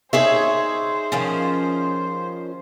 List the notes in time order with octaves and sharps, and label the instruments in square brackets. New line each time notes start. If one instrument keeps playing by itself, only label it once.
[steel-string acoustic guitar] D#4 G#4 E5 [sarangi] C5 [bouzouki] C#5
[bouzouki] D#3 F3 C#4